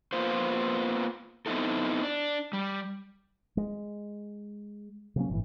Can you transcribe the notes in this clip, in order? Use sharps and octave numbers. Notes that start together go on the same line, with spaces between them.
A#3 B3 F4 C5
B3 C4 D#4 E4 A4
D4
G3
G#3
C3 F#3 A#3 C#4
G1 A2 E3